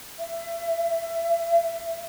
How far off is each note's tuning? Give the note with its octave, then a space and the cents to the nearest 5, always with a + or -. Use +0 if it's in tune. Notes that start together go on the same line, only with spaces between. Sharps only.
E5 +20